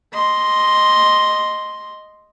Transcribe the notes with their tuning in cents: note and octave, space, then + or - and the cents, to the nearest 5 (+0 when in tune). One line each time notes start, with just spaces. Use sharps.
D#5 +0 C6 +0